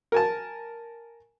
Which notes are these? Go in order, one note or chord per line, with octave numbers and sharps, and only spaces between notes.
A#4 G#5 A5